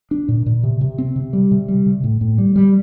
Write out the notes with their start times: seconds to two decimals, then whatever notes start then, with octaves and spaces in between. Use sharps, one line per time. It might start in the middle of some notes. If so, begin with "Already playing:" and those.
0.11 D4
0.29 A#2
0.46 A#2
0.63 C3
0.81 C3
0.98 C4
1.16 C3
1.33 G3
1.51 C3
1.68 G3
1.86 C3
2.04 A2
2.21 A2
2.38 G3
2.56 G3